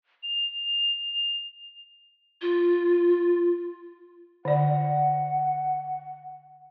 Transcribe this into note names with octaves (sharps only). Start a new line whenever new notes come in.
F7
F4
D3 D5 F#5